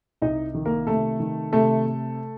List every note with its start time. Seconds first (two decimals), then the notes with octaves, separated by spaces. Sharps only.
0.22 C2 D#4 D#5
0.54 D#3
0.65 A#3 A#4
0.87 C3 A3 A4
1.20 D#3
1.53 C3 A3 A4
1.86 A3